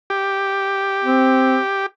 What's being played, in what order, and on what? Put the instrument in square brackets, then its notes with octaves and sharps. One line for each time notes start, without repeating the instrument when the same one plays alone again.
[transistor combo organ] G4
[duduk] C4